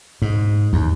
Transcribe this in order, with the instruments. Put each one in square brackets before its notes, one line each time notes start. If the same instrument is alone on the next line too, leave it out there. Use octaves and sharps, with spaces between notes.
[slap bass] G#2
D#2